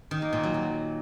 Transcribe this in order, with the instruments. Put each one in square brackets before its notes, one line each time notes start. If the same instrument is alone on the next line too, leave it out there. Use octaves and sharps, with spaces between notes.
[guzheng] D#3
A#3
A#2
F#3
F#3